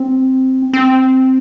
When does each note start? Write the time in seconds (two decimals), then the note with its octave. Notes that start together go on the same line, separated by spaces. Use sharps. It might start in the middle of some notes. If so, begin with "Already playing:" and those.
Already playing: C4
0.73 C4